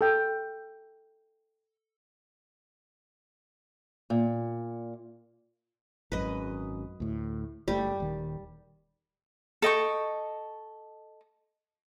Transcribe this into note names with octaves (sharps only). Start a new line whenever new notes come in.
A4 G5
A#2
G#1 F#2 B4 D#5
D2 A2
F#1 G3 A3 G4
D#1 D#3
A4 D#5 G5 C#6